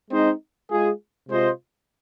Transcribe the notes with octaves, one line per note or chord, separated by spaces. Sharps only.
G#3 C4 D#4 C5 D#5
G#3 F4 G#4
C3 G#3 F4 C5 D#5